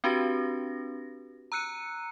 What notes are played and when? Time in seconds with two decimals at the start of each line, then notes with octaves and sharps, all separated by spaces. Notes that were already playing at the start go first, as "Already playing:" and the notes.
0.04 C4 D4 F#4 G4 B4 A#6
1.52 A#5 E6 F#6 C#7 D#7